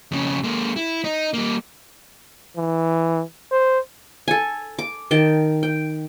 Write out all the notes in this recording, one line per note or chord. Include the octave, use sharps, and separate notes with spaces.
F2 C#3
G#3 A#3
E4
D#4
G3 A#3
E3
C5
A4 G#5
D6
D#3 G5 A5
G5